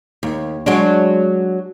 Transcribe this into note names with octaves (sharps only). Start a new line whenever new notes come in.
D#2
F#3 G#3 D4